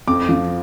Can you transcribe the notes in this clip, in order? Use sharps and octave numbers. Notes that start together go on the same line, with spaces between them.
F2 D6
F3